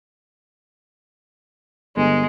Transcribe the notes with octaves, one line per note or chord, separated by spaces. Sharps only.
G1 G#3